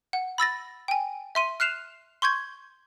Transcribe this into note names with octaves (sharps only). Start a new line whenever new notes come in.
F#5
B5 E6 A6 A#6
G5 G#5
E5 C6 D#7
F6 F#6 C7 E7 F7
C6 C#6 G6 G#6